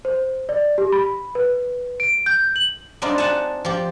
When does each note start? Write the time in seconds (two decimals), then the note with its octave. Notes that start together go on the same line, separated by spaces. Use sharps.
0.05 C5
0.49 D5
0.78 G4
0.92 B5
1.35 B4
2.00 D7
2.26 G6
2.56 F#7
3.02 G3 C4 D4 D#4 F4
3.18 F#5 G#5 A5
3.65 F3 G4